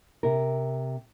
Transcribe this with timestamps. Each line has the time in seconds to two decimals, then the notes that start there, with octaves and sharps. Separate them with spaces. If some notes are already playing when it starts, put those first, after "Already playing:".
0.23 C3 A#4